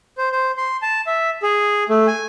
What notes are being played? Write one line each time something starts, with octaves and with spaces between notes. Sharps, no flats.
C5
C5
C6
A5
E5
G#4
A3
G#5